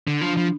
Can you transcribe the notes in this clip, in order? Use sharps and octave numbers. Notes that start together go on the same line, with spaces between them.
D3
F3 D4
F3 D4